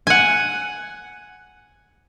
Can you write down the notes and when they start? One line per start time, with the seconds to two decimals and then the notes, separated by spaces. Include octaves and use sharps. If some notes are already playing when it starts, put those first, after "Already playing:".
0.07 F#5 G#5